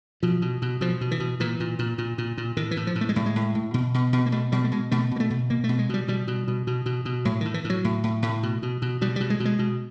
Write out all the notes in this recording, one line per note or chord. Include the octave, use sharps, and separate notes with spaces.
B2 F3
B2
B2
B2 F3
B2
E3
B2
A#2 E3
A#2
A#2
A#2
A#2
A#2
A2 D#3
E3
A2
F3
A2
A3
G#3
A2 G3
G#3
A2
A2
B2
B2
B2
A#3
B2 A3
B2 G3
A3
B2 G#3
B2 A3
B2 A#3
A3
B2
B2 A#3
A3
B2
G#3
B2 G3
B2 G3
B2
B2
B2
B2
B2
A2 F#3
D#3
A2
E3
A2
F#3
A2
A2
A2
B2
B2
B2
B2 G3
G3
B2
G#3
B2
G#3
B2